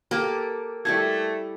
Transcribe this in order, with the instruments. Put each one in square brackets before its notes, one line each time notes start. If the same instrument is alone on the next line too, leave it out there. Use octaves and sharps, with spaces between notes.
[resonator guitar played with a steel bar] A#3 [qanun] G4 A4
[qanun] G3 E4 A4 [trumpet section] A3 [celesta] G#6